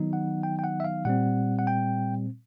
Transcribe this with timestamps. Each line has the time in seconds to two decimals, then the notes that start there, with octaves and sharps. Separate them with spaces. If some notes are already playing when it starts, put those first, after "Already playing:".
Already playing: D#3 F#3 B3 D#4
0.13 F#5
0.43 G5
0.59 G5
0.64 F#5
0.80 E5
0.84 F5
1.05 A#2 G3 C4 F#5
1.59 F#5
1.67 G5